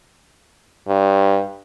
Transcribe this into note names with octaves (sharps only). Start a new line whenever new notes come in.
G2